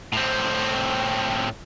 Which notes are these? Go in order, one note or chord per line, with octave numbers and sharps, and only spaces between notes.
A2 C4